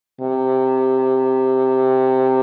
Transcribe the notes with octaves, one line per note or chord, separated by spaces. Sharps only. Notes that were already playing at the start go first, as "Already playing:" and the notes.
C3